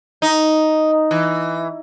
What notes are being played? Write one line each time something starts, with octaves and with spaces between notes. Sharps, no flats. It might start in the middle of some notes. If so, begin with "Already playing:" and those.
D#4
E3